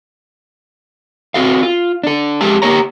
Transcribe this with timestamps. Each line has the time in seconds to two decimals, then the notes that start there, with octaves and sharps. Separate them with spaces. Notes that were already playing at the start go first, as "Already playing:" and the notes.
1.34 C4 F#4 A4 F5
1.63 F4
2.04 D4 A4
2.41 F2 G#3 G4 A5
2.62 A#3 G4 C#5 A#5